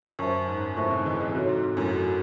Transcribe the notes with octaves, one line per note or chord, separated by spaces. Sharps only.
F#2 C5 E5 A5 C#6
G#2
F#2 A2 C5 E5 A5 C#6
G#2 C3
E3 G#3
E3 G#3
G#2 C3 F#4 A4 C#5
G#2
G#2
F#2 A2
F#4 A4 C#5